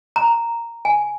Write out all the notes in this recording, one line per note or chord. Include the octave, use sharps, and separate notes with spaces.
A#5
G#5